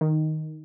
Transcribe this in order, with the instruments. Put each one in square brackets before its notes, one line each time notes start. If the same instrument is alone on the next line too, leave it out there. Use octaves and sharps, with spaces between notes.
[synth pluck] D#3